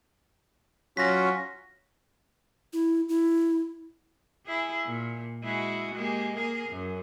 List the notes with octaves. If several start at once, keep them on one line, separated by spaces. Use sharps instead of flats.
F#3 C#4 F4 F#4 A#6 B6
E4
E4
E4 G#4
A#2
G#3 E4 F#4
G#3 A#3 G4
A#3 G#4 A#4
F#2